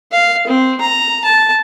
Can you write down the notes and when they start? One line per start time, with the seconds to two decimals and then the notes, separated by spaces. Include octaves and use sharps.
0.12 F5
0.47 C4
0.81 A#5
1.24 A5